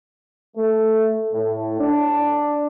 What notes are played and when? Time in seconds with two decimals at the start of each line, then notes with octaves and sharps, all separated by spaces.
0.56 A3
1.32 A2
1.80 D4